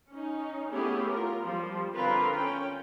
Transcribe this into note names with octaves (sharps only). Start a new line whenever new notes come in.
C#4 D#4
A3 B3 C#4 E4 G4 G#4
F4 A#4
F3 G3
D3 C4 F4 A#4 B4
C#4 G5